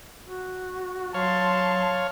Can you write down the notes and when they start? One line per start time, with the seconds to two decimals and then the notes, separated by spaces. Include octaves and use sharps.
0.25 F#4
1.14 F#3 C#5 F5 A5 C6